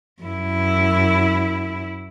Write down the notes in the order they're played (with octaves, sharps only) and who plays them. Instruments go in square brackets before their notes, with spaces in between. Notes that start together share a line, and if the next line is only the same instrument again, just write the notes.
[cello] F#2 E4